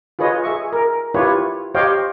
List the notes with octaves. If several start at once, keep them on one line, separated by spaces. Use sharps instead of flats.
F4 G#4 B4 C#5 D#5
G#4 E5 C#6
A#4
E4 F4 G4 B4 C#5
G4 C5 C#5 D#5 F5 G5